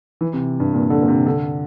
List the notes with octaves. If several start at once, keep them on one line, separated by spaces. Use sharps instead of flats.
E3
C3
G2
A#2
D3
A#2
C3
D3